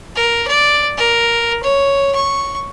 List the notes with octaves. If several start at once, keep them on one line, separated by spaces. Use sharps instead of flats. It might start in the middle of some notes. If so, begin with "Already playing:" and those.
A#4
D5
A#4
C#5
C#6